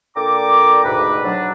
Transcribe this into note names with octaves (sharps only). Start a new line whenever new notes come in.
A#2 D4 A4 G5 A#5 D6
D2 G#2 B2 A4 B4
F#3 D4